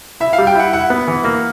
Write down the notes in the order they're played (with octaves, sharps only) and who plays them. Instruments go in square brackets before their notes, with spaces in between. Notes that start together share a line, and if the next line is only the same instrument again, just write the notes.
[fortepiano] E4 [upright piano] E5
[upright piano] F5
[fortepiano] G3
[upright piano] G5
[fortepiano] E4 [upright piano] F#5
[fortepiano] E4 [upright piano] F#5
[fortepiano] B3
E3
A#3